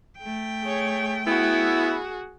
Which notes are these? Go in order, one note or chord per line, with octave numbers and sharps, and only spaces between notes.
A3 G5
G#4 C#5
B3 E4 F#4 G#4